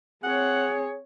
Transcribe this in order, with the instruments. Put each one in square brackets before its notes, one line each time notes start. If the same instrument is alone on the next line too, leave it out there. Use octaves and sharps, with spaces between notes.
[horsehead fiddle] C4 C#5 [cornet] G#4 [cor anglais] F#5